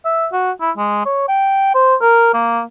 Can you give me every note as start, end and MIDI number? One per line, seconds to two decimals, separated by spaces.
0.05 0.27 76
0.32 0.51 66
0.61 0.71 64
0.77 1.03 56
1.05 1.24 73
1.28 1.70 79
1.74 1.95 72
2.01 2.32 70
2.34 2.61 58